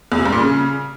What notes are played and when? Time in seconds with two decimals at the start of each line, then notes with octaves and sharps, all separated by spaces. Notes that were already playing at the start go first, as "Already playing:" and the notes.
0.12 E2
0.19 C3
0.25 G2
0.32 A#2
0.39 C#3